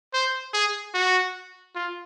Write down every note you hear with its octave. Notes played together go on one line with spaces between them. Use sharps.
C5
G#4
F#4
F4